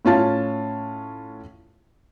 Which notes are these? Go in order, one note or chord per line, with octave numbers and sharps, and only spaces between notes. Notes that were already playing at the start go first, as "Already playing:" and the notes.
A2 C#4 F4 A5 A6